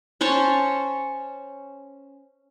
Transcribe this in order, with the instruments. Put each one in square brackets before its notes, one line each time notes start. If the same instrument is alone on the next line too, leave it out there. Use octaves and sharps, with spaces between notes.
[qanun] C#4 C5 C#5 A5